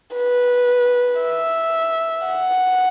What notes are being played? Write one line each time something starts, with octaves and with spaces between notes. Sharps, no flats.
B4
E5
F#5